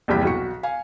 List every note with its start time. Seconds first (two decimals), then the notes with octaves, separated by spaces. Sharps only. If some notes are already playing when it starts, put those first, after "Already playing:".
0.08 A#1 E2 G2 C3 G5 B6
0.23 B1 F#4 C#7
0.63 F5 G#5